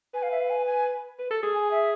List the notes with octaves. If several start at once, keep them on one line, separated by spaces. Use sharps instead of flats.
B4 G#5
F5
E5
F5
G#5
G#5
B4
A4
G#4
G#5
E5